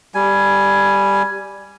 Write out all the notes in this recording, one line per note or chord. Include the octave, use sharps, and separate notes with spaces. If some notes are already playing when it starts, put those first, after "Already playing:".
G3 G#5